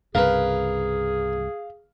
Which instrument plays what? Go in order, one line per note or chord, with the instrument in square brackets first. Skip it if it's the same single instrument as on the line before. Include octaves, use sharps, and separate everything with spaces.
[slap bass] C2 G2 C#3 [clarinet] G#4 [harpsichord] A#4 B4 [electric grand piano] F5